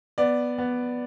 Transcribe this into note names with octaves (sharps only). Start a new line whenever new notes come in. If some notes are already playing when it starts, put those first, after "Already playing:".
B3 D5
B3